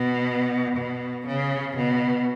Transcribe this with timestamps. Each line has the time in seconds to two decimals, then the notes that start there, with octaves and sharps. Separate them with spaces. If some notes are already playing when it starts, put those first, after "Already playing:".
Already playing: B2
0.76 B2
1.26 C#3
1.76 B2